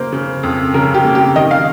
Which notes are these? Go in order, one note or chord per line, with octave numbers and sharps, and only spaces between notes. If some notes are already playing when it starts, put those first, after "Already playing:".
Already playing: C#3 A#3 C5
C#3
F2
C#3 A#4
G4
A#3
G4
D#3 D#5
F5